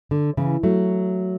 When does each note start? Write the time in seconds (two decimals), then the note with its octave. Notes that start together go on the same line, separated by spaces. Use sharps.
0.11 D3
0.37 C#3 E3
0.63 F#3 A3